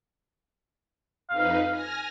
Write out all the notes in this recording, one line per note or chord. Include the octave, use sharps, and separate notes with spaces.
F2 D#4 B4 F5
G#5 F6 A#6